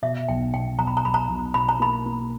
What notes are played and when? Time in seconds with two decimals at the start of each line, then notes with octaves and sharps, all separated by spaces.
0.02 B2 E5
0.28 B1 G5
0.54 B2 G5
0.78 B1 A#5
0.87 B5
0.97 A#5
1.05 B1 B5
1.14 A#5
1.29 B1
1.54 B2 B5
1.69 A#5
1.80 A#3 B5
2.06 A#3